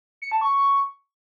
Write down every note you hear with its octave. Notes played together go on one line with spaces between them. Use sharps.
C#7
A5
C#6